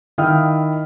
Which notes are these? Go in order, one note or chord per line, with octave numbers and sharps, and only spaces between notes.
D#3 E4 F5 G5 D#6 F6